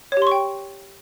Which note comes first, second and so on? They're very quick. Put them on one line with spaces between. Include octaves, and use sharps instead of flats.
C#5 G4 C6 C#6 G5